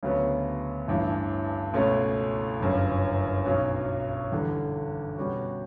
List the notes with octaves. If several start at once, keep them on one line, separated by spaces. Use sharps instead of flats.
D2 C#3 F#3 B3
A1 G2 E3
C#2 B2 A3 C#4
G1 F#2 C#3
B1 B2 F#3 C#4
E2 D3 G3
B2 G3 C#4 F#4